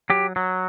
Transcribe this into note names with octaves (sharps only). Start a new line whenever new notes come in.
F#3 G4
F#3